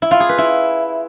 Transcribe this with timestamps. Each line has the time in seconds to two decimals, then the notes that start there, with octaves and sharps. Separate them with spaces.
0.02 E4
0.11 F4
0.20 G#4
0.29 B4
0.38 E4